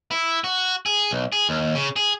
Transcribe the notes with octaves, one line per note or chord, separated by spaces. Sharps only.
E4
F#4
G#4
B1
G#4
D#2
C#3
G#4